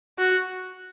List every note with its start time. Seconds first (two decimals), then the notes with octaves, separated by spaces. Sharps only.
0.18 F#4